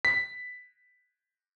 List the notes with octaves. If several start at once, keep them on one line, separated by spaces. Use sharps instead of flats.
B6